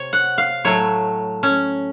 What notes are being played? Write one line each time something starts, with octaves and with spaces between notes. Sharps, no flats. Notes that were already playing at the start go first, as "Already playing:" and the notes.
Already playing: C3 C#5
F#5
F5
A2 F#3 A3 C#5
C#4